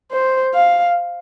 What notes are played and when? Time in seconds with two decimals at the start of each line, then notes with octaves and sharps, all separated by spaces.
0.11 C5
0.54 F5